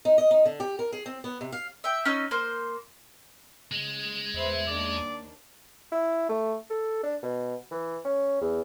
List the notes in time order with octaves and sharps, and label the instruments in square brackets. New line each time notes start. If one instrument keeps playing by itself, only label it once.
[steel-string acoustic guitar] D#4
D#5
D#4
D3
G4
A#4
G#4
C4
B3
C3
F5
[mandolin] E5 G5
C#4 D#4 E6
A#3 C5
[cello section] C#3 [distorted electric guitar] G#3
[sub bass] E2 [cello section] B4 C5 E5
[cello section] D#2 D4 [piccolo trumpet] D5
[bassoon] E4
A3
A4
D4
B2
E3
C#4
E2